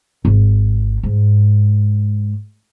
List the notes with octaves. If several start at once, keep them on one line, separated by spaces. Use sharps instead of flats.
G#1
G#2